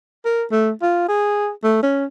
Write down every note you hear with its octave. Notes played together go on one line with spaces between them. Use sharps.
A#4
A3
F4
G#4
A3
C#4